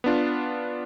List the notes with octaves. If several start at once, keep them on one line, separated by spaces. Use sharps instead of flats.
B3 D4 F4